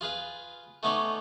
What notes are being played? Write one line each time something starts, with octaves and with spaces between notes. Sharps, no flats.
F4 G#4 B4 F5
A3 B3 C#4 D#4 C#5 D5